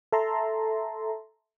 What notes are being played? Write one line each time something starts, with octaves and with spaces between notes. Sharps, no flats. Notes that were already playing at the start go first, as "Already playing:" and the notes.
A4 E5 A5 A#5 C6